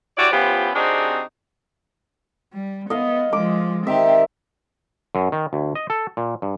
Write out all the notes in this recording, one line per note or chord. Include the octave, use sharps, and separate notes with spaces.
E4 F#4 G4 C#5 D5
F3 B3 C#4 E4 F4 G4
C3 C4 D4 D#4 F#4 G#4
G3
B3 D#5 F5
F3 G#3 D6
D#3 C4 G4 E5
F#2
D#3
D2
D#5
A4
A#2
G2